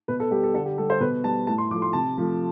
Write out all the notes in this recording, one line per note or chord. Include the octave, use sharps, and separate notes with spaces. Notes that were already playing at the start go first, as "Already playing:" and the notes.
B2 B4
A4
G3 G4
A4
D3 A4
G4
G3 A4
C5
B2 B4
G3 A5
A2 A5
C6
F3 A3 D6
C6
C3 A5
F3 A3